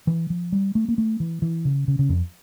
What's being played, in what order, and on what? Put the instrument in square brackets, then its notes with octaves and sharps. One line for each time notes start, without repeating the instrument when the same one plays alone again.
[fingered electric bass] E3
F3
G3
A3
A#3
A3
E3
E3
C#3
C#3
C#3
F2